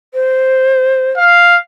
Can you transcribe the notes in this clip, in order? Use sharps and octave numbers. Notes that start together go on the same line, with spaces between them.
C5
F5